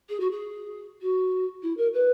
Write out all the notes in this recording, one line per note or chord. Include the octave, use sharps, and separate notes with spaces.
G#4
F#4
G#4
F#4
E4
A#4
B4